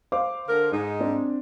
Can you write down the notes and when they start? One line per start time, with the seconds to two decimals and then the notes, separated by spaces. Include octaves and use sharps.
0.12 C5 F5 D6
0.48 D3 A#4
0.71 G#2 D#4 G#4
1.01 C4 D4